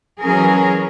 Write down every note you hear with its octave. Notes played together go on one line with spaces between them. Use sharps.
E3 F#3 C#4 G#4 A#4